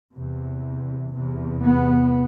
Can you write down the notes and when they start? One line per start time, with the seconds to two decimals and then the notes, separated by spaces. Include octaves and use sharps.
0.16 E2 C3
1.15 E2 C3
1.64 B3